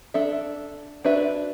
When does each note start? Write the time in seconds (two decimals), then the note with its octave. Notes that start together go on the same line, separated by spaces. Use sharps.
0.14 D4 A4 E5
1.05 D4 F#4 B4 E5